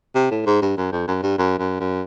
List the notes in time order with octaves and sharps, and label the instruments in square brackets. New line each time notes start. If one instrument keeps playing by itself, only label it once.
[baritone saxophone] C3
A2
G#2
G2
F#2
F2
F#2
G2
F#2
F#2
F#2